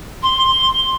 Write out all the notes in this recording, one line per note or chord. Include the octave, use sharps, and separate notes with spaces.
C6